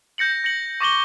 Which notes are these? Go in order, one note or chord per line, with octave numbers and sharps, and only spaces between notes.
G6 A#6 C#7 F#7
A#6 C#7 F#7
C#6 D6 A#6 F#7 G7